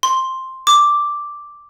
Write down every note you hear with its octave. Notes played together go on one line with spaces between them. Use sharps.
C6
D6